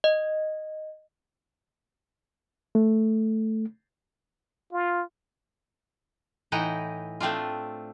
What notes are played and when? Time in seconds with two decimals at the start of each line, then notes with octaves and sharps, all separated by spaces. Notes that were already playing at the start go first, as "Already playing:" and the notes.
0.04 D#5
2.75 A3
4.73 F4
6.52 A2 E3 D#4 F#5 G5 A#5
7.20 A3 C4 D4 F4